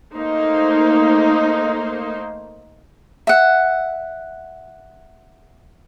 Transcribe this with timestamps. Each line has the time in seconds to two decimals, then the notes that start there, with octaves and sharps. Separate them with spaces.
0.15 A3 A#3 D#4 C5
3.27 E5 F#5